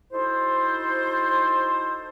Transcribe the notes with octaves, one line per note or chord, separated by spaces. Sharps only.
D#4 E4 F#4 A4 C5